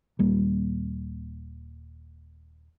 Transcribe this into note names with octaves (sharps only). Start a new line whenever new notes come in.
D#1 G3 A#3